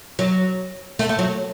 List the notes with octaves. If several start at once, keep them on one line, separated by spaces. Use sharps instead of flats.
F#3
A3
A3
F#3